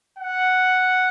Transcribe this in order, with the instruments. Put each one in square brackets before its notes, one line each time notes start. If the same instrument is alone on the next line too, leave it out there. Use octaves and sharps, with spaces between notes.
[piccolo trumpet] F#5